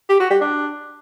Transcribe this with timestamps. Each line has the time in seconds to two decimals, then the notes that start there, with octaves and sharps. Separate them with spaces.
0.09 G4
0.20 F#4
0.30 G3
0.41 D4